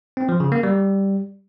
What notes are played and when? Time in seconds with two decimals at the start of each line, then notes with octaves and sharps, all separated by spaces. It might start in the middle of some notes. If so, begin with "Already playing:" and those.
0.17 C4
0.29 F3
0.40 C#3
0.52 A#3
0.63 G3